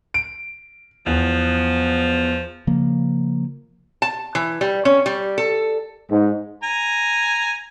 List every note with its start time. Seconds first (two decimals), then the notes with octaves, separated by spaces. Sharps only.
0.14 D7
1.06 E2 F3
2.67 C#3 F3 A#3
4.02 A5
4.35 E3
4.61 G3
4.85 C#4
5.06 G3
5.38 A4
6.10 G#2
6.63 G#5 A#5